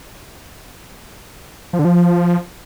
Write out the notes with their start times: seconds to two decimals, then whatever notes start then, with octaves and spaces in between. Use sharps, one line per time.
1.73 F3
1.79 D3
1.85 F3